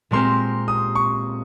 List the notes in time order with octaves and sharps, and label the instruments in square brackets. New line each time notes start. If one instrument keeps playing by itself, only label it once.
[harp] A#2 G#3 C4 G4 A#4 [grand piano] C6
[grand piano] D#6
C#6